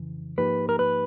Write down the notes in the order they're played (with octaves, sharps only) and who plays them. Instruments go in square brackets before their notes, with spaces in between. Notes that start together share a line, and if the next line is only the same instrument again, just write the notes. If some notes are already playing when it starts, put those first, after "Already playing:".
Already playing: [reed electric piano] F2 C#3 E3
[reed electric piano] G#2 F3 A#3 D#4 G4 [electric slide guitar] B4
[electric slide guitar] A#4
B4